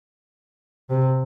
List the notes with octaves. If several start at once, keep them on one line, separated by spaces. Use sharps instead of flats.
C3